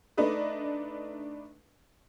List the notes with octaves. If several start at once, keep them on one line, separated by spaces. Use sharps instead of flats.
A3 D4 D#4 B4 D#5